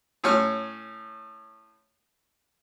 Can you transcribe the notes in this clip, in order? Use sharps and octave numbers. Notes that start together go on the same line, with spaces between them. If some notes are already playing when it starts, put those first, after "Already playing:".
A2 C#4 C#5 F6